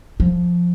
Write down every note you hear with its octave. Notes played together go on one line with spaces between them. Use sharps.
F3